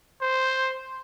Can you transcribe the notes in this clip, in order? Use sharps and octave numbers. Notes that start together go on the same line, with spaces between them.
C5